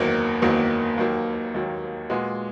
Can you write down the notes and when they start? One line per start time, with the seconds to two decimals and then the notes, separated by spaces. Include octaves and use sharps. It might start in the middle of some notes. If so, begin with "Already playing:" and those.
Already playing: F#1 E2 D#3 F#3 A#3
0.42 F#1 E2 D#3 F#3 A#3
0.98 D#2 D#3 F#3 A#3
1.54 D#2 D#3 F#3 A#3
2.10 A#2 G#3 B3 F#4